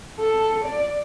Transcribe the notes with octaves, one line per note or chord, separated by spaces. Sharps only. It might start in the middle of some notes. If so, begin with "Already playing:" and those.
A4
D5